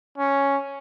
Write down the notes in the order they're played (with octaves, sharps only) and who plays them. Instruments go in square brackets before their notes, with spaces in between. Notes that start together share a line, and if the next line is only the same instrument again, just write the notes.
[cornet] C#4